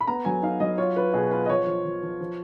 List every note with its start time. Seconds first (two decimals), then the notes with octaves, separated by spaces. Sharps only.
0.01 B5
0.07 B3 A#5
0.25 F#3 G#5
0.42 D#4 F5
0.60 F#3 D#5
0.78 F4 C#5
0.96 F4 B4
1.13 B2 G#4
1.31 F4 B4
1.46 D#5
1.49 F3 C#5
1.67 F3
1.85 F3
2.03 F3
2.21 F3